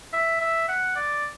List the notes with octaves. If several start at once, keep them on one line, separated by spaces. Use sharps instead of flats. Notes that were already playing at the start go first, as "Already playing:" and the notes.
E5
E5
F#5
D5